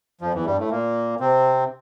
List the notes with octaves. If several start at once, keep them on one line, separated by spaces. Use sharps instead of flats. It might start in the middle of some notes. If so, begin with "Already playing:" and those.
F2 F3
E2 E3
G2 G3
A2 A3
A#2 A#3
C3 C4